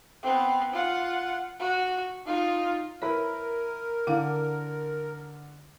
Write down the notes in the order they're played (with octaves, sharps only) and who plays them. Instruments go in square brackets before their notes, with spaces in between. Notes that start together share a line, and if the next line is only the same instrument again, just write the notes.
[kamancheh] B3 C4
F4 F#5
F#4
D#4 F4
[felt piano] E4 B4 B5 [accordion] A#4 [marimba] C#5
[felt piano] D3 [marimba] E4 F5 F#5